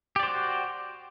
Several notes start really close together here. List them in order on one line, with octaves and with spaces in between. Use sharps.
G4 D5 C5 F#4